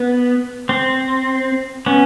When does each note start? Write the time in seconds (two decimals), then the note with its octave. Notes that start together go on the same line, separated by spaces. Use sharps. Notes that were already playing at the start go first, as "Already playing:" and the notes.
Already playing: B3
0.69 C4
1.86 B3 C#4